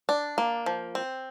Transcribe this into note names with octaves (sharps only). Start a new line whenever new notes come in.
D4
A#3
F3
C4